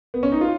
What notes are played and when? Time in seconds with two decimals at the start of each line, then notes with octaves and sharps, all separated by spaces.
0.14 B3
0.23 C#4
0.32 D#4
0.41 F4